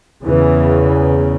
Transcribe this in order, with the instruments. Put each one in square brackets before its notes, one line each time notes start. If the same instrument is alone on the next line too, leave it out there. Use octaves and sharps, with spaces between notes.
[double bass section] E2 C#3 E3